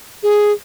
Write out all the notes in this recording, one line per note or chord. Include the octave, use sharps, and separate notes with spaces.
G#4